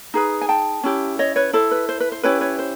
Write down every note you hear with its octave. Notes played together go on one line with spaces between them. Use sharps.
D#4 G#4 B4
G#5
G5 A5
C#4 E4 G4
C#5 D#5
B4 C#5
E4 A4 C5
B4
C5
B4
C5
C#4 E4 G4 B4 C#5
B4 C#5
C5